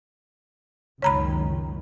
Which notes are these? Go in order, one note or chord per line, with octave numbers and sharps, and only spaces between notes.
F#1 C#2 D#3 C#5 A#5 B5